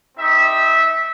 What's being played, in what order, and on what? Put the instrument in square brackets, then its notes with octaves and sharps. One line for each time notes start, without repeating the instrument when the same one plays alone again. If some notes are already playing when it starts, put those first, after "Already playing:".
[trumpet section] C4 D#4 G4 E5